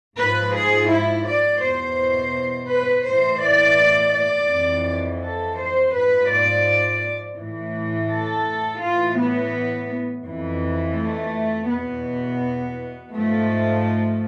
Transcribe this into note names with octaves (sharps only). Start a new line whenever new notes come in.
G#2 F3 B4
G#4
E4
D5
E2 B2 C5
B4
A2 E3 C5
D5
D5
F2 E3
A4
C5
G#2 F3 B4
D5
A2 E3
A4
A2 E3 F4
B3
F2 E3
A3
E2 B2 B3
G#2 F3 A3